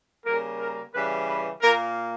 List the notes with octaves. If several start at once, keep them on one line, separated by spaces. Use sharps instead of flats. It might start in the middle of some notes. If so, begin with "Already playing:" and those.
C#3 G3 A#3 A#4
A#4
C#3 E3 G3 B4
B4
A#2 A#3 A#4